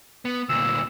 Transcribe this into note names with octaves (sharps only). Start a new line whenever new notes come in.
B3
D2 A#2 E6